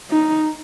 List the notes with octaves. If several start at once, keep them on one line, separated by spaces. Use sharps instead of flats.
D#4